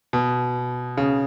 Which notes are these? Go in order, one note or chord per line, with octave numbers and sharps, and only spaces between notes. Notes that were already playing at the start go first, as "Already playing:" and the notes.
B2
C#3